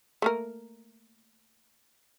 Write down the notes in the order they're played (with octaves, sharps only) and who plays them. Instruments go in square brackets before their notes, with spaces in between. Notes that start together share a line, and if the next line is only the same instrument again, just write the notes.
[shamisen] A3 A#3 A#4